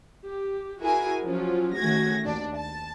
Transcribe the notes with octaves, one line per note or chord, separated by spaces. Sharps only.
G4
E4 F#4 G#4 A#4 G#5
F3 F#3 C#4 F4
D#3 A3 C#4 F#4 G#6 A#6
D#2 D4 D5
A5